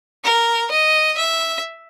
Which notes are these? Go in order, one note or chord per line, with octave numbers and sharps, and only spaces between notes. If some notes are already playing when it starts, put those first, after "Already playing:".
A#4
D#5
E5